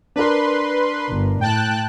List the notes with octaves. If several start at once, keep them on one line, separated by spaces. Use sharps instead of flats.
D4 A#4 B4 C6
G1
A2 G5 A5 F#6